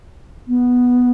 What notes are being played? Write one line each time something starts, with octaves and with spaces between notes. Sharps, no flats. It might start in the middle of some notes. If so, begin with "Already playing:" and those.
B3